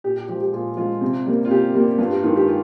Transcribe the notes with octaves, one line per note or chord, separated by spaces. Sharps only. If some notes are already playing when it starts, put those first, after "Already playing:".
A#2 G4
G4
F3 G#3 G4
G4
A#2 F4 G#4
F3 G#3 F4
C3
G3 A#3
F4
C3 G4
G3 A#3
G2 F4
G4
D#3 G#3 F4
G4
F4